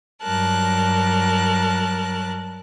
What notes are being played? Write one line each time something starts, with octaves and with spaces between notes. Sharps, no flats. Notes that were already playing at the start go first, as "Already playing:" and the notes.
G2 F#3 A#4 A5 F#6